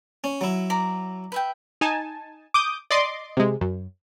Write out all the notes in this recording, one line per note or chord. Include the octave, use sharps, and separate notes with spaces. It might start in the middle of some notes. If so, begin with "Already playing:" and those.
C#4
F#3 E4
D5 A#5
B4 E5 G5
D#4 G#5 A5
D6 D#6 G6
D5 D#5 C6 D6
C3 G#3
F#2